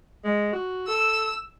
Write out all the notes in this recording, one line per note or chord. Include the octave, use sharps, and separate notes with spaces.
G#3
F#4
A4 E6